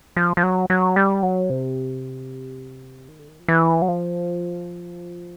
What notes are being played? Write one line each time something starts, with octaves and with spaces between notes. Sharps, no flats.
F3
F3
F#3
F#3
G3
F#3
C3
D#3
D3
D#3
F3
E3
F#3
F3